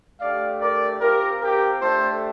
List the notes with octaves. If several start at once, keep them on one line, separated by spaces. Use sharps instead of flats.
A3 D4 G4 D5 F5
A#4 D5
C4 F4 G4 A#4
G4 A#4
A3 D4 G4 A4 C5